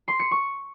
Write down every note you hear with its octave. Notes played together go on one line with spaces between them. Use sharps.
C6
C#7
C#6